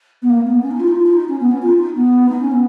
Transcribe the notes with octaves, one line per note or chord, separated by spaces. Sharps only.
B3
A#3
B3
C#4
D#4
F4
D#4
F4
F4
D#4
C#4
B3
C#4
F4
D#4
B3
D#4
C#4
B3